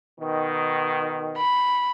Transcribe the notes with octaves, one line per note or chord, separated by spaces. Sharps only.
B2 D#3
B5